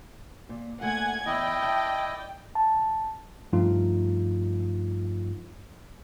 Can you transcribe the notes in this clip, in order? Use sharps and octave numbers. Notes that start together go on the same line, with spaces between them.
A#2
A#2 A3 F#5 G#5 G#6
E2 E4 D5 D#5 G5
E5 A5
A5
G2 F3 A3 D#4 F4